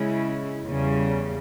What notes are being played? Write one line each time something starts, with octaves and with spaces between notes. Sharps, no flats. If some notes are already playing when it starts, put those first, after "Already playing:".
Already playing: C#3 G#3 C#4 E4
E2 C#3 G3